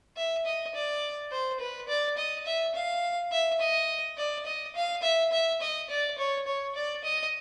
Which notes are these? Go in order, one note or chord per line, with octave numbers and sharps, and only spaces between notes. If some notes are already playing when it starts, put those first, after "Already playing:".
E5
D#5
D5
C5
B4
D5
D#5
E5
F5
E5
D#5
D5
D#5
F5
E5
E5
D#5
D5
C#5
C#5
D5
D#5